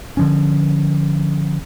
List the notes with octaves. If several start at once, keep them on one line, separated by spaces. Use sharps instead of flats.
D3 F3 C#4